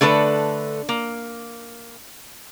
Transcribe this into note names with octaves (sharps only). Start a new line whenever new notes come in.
D3 A3 A4 B4
A#3